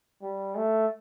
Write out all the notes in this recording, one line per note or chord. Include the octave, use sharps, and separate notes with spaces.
G3
A3